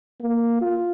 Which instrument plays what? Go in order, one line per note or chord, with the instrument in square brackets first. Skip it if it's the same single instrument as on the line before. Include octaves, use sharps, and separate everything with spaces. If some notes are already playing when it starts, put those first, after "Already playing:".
[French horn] A#3
F4